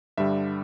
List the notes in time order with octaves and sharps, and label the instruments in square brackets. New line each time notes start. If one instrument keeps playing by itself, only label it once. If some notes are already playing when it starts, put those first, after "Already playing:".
[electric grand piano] G2 D3 G3 E5